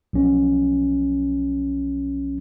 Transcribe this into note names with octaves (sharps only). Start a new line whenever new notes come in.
B1 F3 C#4